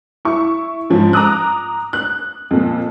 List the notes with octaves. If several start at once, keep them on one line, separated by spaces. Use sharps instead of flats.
E4 C#6
G#2 F3 C#4
A#5 D6 D#6 F#6
F#6
F2 A#2